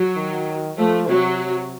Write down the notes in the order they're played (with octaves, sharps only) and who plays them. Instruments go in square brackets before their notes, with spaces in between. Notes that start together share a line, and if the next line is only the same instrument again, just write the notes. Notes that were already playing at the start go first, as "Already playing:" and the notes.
Already playing: [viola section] F#3
[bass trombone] D#3
[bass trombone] F3 [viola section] A3
[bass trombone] C3 [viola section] F#3